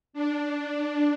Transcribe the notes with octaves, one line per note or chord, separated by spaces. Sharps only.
D4